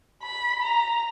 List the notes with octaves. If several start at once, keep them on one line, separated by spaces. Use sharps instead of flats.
B5
A#5